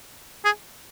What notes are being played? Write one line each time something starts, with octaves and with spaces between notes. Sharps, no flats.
G#4